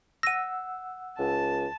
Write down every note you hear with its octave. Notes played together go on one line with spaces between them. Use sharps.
F#5 E6 A#6 D#7
C#2 A5